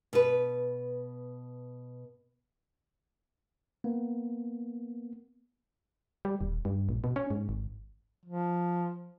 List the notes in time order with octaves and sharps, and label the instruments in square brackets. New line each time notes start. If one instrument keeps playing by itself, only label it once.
[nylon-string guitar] B2 B4
[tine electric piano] A#3 B3
[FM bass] G3
D#1
G2
A#1
B2
C#4
G#2
G#1
[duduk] F3